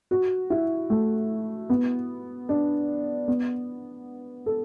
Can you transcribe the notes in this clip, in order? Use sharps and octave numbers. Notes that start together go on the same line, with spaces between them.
F#4
E4
A3
B3
D4
B3
A4